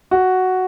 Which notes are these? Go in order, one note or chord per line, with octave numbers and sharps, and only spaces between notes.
F#4